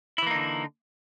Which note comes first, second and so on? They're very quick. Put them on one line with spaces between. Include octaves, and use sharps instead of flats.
E4 E3 A#3 D#4 D3